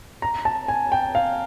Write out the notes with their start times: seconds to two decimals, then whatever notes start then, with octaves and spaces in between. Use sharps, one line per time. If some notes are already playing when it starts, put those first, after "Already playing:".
0.22 A#5
0.45 A5
0.68 G#5
0.92 G5
1.15 F5